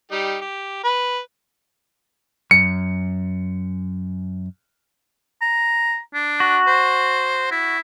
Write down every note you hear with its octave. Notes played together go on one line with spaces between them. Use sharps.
G3 D#4 G4
G4
B4
F#2 C#7
A#5
D4
F#4
C5
E4